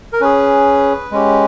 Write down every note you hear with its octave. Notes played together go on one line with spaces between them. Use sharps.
A#4
C#4 G#4 B4
G#3 C#4 G4